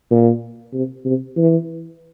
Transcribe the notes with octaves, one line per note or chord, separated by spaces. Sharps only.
A#2
C3
C3
E3